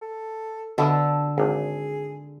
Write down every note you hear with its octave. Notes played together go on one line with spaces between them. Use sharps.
A4
B2 D3 D4 A4 E5
G#1 G#4